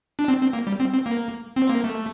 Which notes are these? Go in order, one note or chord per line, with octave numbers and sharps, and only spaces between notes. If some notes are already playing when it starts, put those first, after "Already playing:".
D4
C4
C4
A#3
G3
C4
C4
A#3
C4
A#3
A3